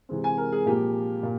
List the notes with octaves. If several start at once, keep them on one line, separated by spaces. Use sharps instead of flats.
C3 E3 G#3 C4
G#5
A#4
G#4
A#2 F3 A#3 G4
A#2